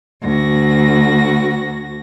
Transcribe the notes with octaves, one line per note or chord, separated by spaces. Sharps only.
D2 F#4 A#6